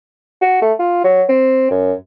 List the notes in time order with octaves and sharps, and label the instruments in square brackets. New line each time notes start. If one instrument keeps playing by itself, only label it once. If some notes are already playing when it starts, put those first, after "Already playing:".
[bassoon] F#4
A3
F4
F#3
C4
F#2